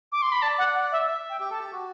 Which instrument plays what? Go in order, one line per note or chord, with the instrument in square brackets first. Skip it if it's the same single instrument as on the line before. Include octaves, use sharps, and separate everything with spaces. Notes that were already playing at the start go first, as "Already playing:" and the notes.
[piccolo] D6
C6
B5
[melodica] D5 [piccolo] A5
[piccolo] F#5
F#5
E5
[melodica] E5
[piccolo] G5
[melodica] G4
[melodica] A4 [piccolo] A5
[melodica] G4
F#4